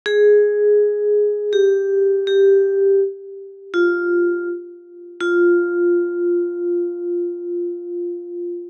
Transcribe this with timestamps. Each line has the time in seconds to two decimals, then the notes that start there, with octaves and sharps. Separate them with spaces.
0.06 G#4
1.53 G4
2.27 G4
3.74 F4
5.21 F4